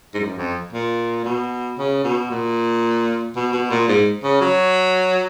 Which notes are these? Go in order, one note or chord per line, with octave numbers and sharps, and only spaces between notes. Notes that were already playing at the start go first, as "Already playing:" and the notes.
G#2
F#2
F2
A#2
B2
C#3
B2
A#2
B2
B2
A#2
G#2
C#3
F#3